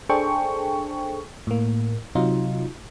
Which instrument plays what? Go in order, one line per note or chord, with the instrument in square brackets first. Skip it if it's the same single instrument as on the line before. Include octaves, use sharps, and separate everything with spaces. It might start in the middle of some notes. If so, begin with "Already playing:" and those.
[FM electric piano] D4 G#4 A4 C5 G5 C#6
A2 A#3
C3 F#3 D#4 F4